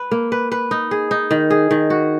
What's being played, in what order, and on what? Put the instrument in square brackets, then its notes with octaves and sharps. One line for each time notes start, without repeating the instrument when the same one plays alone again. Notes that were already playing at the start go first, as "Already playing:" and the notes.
Already playing: [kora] B4
A#3
B4
B4
D#4
G#4
D#4
D#3
G#4
D#3
F#4